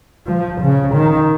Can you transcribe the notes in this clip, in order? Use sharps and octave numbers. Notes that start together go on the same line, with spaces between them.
F3
C#3
D#3